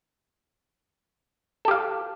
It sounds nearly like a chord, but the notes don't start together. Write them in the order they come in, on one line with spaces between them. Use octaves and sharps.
A4 G4 F5